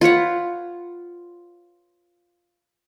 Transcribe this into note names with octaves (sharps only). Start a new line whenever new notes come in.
F4 B4 C#5 F#5